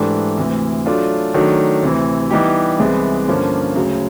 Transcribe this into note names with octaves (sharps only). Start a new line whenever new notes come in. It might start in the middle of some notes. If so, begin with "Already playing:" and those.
Already playing: G#2 E3 A3 D4 G4
D2 C3 E3
F#3 A3 D4 F4
D#3 F#3 A3 D4 F#4
D2 C3 E3
E3 G3 B3 D#4 G4
C2 C3 E3 G#3 B3
G2 D3 F3 A#3 C#4
D2 C#3 F#3